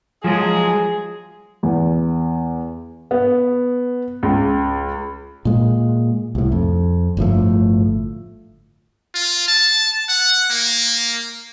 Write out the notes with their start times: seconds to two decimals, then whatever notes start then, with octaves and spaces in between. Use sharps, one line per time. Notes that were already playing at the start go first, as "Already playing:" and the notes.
0.24 F3 F#3 G#3 G#4
1.63 E2
3.11 B3
4.23 C#2
5.45 A#2 G#3
6.35 C2 A2
6.52 F2
7.17 G1 A2 F3 A3
9.15 F4
9.48 A5
10.09 F#5
10.51 A#3